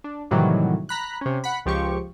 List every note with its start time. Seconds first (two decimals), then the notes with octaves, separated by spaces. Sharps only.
0.04 D4
0.31 A2 C3 D#3 E3 F#3 G3
0.89 A#5 B5 F#6
1.21 C3 C#4
1.44 F#5 B5
1.66 C#2 F3 G4 C#6